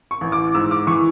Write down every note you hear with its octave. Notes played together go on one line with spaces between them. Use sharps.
C#6
A1
D6
G#2 E6
D6
E3 C#6